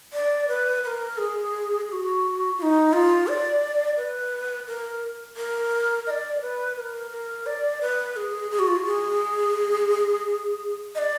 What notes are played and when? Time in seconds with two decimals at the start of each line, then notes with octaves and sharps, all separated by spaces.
0.13 D5
0.48 B4
0.84 B4
0.87 A#4
1.18 G#4
1.88 G#4
1.92 F#4
2.58 F4
2.62 D#4
2.93 F4
3.28 D5
3.97 B4
4.67 A#4
5.37 A#4
6.07 D#5
6.10 D5
6.42 B4
6.76 B4
6.80 A#4
7.11 A#4
7.46 D5
7.82 B4
8.16 G#4
8.51 G#4
8.59 F#4
8.68 F4
8.76 F#4
8.86 G#4
10.95 D#5
10.98 D5